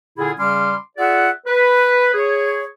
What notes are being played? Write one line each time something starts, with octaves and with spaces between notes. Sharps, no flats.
A#2 D3 E4 F4 G#4
C#3 G3 C#4 C6 D6 F6
F4 G#4 D5 E5 F#5
B4
G#4 C#5